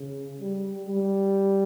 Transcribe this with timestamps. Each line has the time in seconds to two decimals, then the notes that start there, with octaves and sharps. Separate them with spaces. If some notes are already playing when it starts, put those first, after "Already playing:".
Already playing: C#3
0.40 G3
0.88 G3